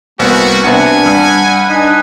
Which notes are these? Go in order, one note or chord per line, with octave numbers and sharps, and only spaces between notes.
C2 A#3 B3 F#4
C3 B3 D4 F#5 G#5
G2 F#5 B5
D4 D#4 B4 G#5